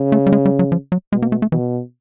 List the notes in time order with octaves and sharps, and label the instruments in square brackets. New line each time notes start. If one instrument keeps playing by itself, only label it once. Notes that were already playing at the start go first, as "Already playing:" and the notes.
Already playing: [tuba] C#3
[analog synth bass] A3
G3
G#3
G3
F#3
F3
F#3
[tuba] B2 [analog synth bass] G#3
[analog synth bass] A#3
A3
A3
[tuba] B2 [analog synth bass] E3